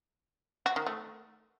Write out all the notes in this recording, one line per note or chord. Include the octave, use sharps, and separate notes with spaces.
F#4
D#3
A3